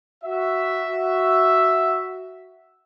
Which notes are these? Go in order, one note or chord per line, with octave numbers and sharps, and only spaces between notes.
F#4 E5